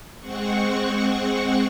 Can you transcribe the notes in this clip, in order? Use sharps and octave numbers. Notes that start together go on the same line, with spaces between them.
G#3 C4 F#5 C#6